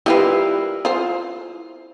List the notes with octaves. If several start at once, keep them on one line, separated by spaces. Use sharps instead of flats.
G3 E4 F4 A#4 B4 F5
F4 C5